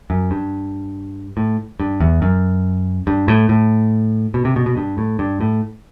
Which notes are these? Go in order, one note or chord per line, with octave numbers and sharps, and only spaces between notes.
F#2
G2
A2
G2
E2
F#2
G2
A2
A2
B2
C3
B2
B2
G2
A2
G2
A2